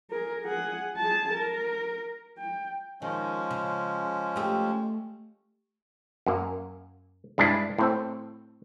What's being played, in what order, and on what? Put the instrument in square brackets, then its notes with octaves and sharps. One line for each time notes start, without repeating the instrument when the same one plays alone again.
[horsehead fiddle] G#4 A#4
G#4 F#5
G#4 A5
A#4
G5
[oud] D#3 [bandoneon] F3 G#3 C#4
[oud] C#3
A3 G4
[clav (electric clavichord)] F#2 A#3
G2 G#3 D4 E4
A2 C4 A4